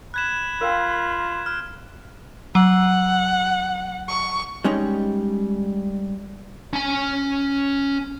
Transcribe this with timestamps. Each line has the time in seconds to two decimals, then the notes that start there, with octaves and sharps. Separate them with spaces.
0.14 B5 F#6 G#6 E7
0.61 F4 A#4 F5 G5
1.46 F6
2.55 F#3 F#5
4.08 C#6
4.64 G3 G#3 C#4 D#4
6.73 C#4 G#5